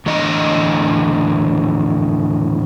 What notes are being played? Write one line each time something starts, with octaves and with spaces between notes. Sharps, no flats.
E2 A2 D3 D#5